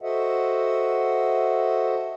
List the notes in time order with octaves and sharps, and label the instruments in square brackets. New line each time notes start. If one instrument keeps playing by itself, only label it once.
[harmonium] F#4 A4 C5 D#5 E5 F#5